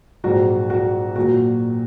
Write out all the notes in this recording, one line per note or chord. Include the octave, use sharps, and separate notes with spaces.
A#1 G#2 F#3 F#4
F#4
A#2 F#3 F#4